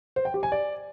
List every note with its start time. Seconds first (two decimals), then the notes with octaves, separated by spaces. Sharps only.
0.16 C5
0.25 G5
0.34 G4
0.43 G#5
0.52 D5